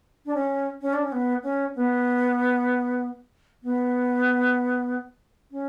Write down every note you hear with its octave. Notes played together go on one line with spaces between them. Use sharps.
D4
C#4
C#4
D4
C#4
B3
C#4
B3
B3
C#4